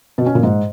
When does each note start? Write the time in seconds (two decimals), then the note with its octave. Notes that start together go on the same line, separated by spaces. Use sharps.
0.18 B2
0.26 C#4
0.35 A#2
0.43 G#2